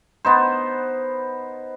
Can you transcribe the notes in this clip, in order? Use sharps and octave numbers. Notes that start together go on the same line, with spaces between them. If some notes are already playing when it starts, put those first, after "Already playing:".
B3 D#4 C5